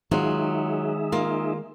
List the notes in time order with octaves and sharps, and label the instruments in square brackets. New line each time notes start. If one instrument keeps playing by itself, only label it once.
[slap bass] D#3 G#3 [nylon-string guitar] F#3 F4 [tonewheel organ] D#4 G#4 E5
[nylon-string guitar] A#3 F4